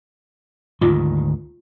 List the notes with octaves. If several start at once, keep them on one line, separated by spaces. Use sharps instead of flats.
D2 G#2 D#3 F4